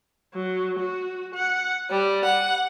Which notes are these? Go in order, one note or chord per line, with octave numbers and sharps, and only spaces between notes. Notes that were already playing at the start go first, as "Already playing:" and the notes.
F#3
F#4
F#5
G3
F#5